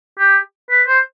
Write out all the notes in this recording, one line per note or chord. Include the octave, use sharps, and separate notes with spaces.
G4
B4
C5